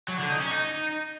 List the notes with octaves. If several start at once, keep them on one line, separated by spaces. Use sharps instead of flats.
F#3
D3
D#4
C#4
D#4